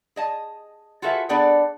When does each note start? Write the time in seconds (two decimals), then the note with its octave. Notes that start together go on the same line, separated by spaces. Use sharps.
0.16 G#4 D#5 A5
1.02 F4 F#4 G#4 A4 B4 E5
1.29 B3 D4 G#4 A4 D5 G5